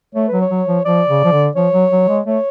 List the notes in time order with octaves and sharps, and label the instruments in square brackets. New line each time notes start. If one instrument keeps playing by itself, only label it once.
[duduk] A3 [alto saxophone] C#5
[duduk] F#3 [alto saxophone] B4
[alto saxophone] C#5
[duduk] F#3
F3
[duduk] F3 [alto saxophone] D5
[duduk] C#3
F3
D3
[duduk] F3 [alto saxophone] C#5
[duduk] F#3
F#3
G#3
[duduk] A3 [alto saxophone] C#5